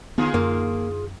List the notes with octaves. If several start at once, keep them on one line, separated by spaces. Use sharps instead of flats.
D3 B3 F4 G#4
F#2 A#3